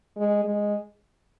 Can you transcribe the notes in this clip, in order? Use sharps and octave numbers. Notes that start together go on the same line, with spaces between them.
G#3
G#3